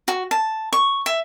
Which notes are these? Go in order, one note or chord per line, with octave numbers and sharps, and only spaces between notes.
F#4
A5
C#6
E5